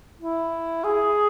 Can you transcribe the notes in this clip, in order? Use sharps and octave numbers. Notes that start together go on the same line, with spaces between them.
E4
G#4